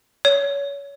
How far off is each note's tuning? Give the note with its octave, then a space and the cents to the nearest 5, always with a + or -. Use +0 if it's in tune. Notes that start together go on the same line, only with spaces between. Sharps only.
C#5 +25